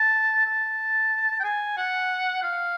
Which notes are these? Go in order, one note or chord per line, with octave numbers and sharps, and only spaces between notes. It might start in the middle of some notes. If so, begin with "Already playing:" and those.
Already playing: A5
A5
G5
G#5
F#5
F5